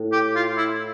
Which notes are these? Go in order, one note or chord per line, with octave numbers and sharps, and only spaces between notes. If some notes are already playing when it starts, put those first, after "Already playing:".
Already playing: A2
G4
F4
E4